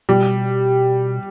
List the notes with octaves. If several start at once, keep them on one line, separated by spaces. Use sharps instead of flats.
B2 G3